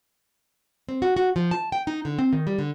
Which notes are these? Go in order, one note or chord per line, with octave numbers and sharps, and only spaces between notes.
C4
F#4
F#4
F3
A5
G5
D#4
D3
C4
D#3
G3
D3